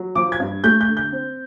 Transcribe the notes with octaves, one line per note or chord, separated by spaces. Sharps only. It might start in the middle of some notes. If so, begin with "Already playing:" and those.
Already playing: F#3
F3 D6
G#6
G2
A3 G6
G6
D3
G6
C4